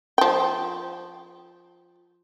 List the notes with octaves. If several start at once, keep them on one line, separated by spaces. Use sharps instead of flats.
F3 G5